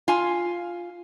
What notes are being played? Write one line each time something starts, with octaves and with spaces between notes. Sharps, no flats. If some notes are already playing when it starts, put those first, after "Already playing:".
F4 G#5